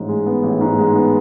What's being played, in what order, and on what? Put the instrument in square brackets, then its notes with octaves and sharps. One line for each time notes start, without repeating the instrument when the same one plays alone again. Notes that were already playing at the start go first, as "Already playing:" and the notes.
Already playing: [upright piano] A1 G#2
G#3
B3
A1
G#2
G#3
B3